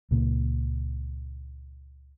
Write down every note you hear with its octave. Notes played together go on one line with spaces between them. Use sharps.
C#2 A#2 A#3